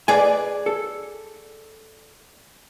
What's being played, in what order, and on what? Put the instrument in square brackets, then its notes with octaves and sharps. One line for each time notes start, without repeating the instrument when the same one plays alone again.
[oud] G#4 D5 [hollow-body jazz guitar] B4 G#5
[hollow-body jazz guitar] A4